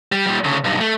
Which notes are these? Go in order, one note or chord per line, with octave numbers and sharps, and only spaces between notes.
G3
A#2 G3
D2 C#3
B1 G2
A3